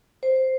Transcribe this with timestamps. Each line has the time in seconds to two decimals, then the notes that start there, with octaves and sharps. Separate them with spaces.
0.23 C5